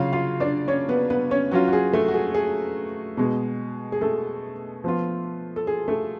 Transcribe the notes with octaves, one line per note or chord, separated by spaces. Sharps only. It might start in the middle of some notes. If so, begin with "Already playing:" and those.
Already playing: C#3 F#3 C#4 F4 F5
F4 F5
D4 D5
C#4 C#5
B3 B4
B3 B4
C#4 C#5
F#3 C#4 F4 F#4
F#4
G#4
A3 A4
F#4
G#4
G#4
B2 G#3 B3
G#4
A3 A4
F3 B3 F4
A4
G#4
A3 A4